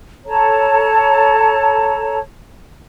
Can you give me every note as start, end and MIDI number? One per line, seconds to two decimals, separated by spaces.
0.26 2.18 69
0.26 2.18 73
0.26 2.18 81
0.26 2.18 82